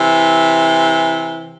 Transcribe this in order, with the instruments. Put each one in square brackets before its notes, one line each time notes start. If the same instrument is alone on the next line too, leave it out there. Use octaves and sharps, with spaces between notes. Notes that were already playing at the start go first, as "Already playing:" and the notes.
Already playing: [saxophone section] C3 E3